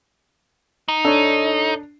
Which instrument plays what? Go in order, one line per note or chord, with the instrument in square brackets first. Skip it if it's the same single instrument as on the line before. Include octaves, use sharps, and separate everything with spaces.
[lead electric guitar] D#4
[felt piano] D4 [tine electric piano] A4 C#5